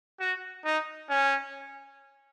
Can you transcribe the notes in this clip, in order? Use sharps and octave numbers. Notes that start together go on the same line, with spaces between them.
F#4
D#4
C#4